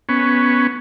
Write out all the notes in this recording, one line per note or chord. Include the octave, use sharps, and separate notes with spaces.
B3 C#4